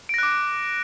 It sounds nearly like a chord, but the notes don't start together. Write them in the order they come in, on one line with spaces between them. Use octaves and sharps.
D7 A#6 F#6 D6